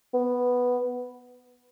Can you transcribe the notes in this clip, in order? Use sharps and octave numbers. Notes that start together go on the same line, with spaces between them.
B3